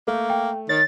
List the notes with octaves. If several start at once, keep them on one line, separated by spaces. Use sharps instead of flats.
A3 A#3
G5
D#3 C#5 A6